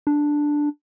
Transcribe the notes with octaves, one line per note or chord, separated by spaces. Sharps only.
D4